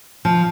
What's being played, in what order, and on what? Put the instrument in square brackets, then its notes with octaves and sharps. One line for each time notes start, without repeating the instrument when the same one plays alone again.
[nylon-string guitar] F3